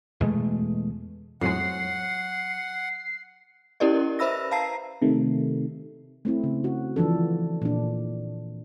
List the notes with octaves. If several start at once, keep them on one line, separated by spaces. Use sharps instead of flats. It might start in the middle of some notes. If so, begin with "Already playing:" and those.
E2 B2 G#3 A3
F2 A2 F#3 G#3 F#5 C7
C#4 E4 G4 A#4 D5 D#5
B4 C5 E5 B5 E6 A#6
F5 A5 A#5 C7
C3 D#3 A3
A3 C4 E4
C#3
F#4
E3 F3 D4 A4
A#2 D4